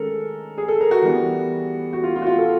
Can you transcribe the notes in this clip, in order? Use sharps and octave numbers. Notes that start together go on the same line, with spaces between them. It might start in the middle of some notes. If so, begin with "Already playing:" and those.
Already playing: D#3 G#3 C#4 A4 A#4
G#4
A4
A#4
F#4
E3 G3 B3
F#4
F4
F4
F#4
F4
A4